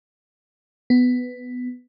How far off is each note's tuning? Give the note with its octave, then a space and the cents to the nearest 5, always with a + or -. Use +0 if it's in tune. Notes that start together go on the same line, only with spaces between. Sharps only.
B3 +10